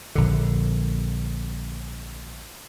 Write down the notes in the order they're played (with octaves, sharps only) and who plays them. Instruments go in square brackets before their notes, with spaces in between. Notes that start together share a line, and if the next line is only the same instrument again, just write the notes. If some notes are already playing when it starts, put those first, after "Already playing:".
[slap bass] A#1 D3